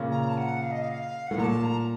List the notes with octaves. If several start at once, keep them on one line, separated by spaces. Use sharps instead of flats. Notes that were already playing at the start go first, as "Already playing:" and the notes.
Already playing: A#2 C#3
A#5
A5
F#5
F5
D#5
F5
A2 F#5
A#2 A#5
A5
A#5